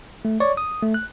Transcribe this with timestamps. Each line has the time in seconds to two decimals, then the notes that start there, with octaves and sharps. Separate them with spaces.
0.25 A3
0.40 C#5 D5 C#6
0.57 D#6
0.82 A3
0.94 F#6